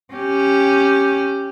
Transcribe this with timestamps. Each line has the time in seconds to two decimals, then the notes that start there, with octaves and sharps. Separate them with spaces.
0.14 C#4 G4